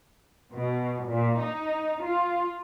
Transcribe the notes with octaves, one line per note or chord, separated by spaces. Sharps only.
B2
A#2
D#4
F4